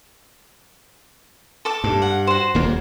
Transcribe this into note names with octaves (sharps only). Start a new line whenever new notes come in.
A4 A5 D6
G2
F#5
F#4 C5
D#1 F2 A#3